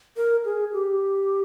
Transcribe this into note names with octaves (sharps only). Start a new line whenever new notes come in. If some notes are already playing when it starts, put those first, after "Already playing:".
A#4
G#4
G4